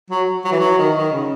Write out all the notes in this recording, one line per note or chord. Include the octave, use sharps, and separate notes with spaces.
F#3
F#3
E3
F#3
D#3
D#3
C#3